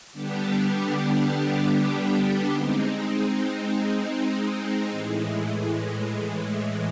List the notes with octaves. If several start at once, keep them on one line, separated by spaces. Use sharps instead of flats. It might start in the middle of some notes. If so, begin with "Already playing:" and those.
D3 G3 B3 D4 G4
G#3 C4 D#4
A2 E3 G#3